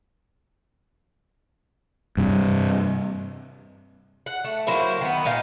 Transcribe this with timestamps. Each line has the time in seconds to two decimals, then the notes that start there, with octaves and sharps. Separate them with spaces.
2.17 G2 C3
4.26 F#5
4.45 A3
4.67 F#3 A#3 E4 C5
5.01 D#3 B3
5.25 A#2 D#4 F5